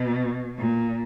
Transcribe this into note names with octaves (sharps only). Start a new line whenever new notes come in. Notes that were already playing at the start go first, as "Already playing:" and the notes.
Already playing: B2
A#2